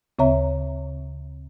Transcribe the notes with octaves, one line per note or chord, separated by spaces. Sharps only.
D2 C#3 C4 C#5 E5 A#5